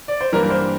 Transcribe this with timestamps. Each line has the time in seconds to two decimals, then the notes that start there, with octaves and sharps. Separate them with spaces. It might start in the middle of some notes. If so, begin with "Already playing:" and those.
0.08 D5
0.21 C5
0.32 G2 E3 G3 A#3 A#4
0.44 A#4
0.50 C5